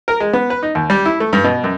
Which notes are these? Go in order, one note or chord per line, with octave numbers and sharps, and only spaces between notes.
A#4
G#3
B3
B4
D#4
D#2
G3
E4
A3
G2
B2
F#2